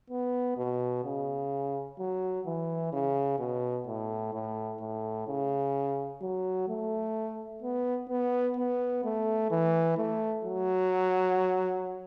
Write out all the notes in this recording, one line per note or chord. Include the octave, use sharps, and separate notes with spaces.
B3
B2
C#3
F#3
E3
C#3
B2
A2
A2
A2
C#3
F#3
A3
B3
B3
B3
A3
E3
A3
F#3